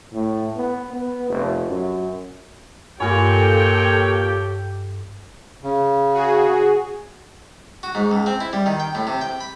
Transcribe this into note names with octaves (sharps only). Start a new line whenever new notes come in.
A2
B3
B3
F1
F#2
G2 A#2 F4 G4 A4 C#5 G5 G#5
C#3
F#4 G#4
F#4
G#2
C#2
C4
E4
G3
D#3
G5
A2
C3
G5
B5